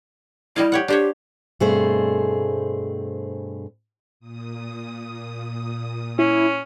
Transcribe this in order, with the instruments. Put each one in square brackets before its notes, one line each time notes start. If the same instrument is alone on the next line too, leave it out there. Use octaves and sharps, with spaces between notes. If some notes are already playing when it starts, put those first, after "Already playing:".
[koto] G3 D#5 F5 [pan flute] E4
[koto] G4 C#5 F#5
[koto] D4 C5 C#5 [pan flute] G4
[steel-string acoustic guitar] G2 B2 A3 C4 G#4 C5
[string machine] A#2 D#6
[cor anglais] C#4 [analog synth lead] E4